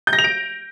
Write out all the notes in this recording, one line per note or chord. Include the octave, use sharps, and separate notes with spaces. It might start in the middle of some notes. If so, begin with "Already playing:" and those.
G6
A#6
F7
D7